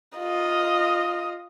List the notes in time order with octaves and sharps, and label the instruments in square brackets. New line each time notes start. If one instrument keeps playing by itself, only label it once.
[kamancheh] F4 D#5